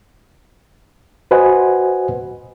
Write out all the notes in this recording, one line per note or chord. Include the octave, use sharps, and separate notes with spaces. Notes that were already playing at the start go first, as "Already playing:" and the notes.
F#4 B4 C5 D#5 F#5 G#5